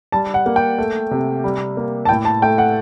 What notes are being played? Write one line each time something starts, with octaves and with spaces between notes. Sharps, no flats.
G3 A5
F#5
A#3
G5
A3
C3
G3
A#3
A5
A2 G5
A5
A3 G5
F#5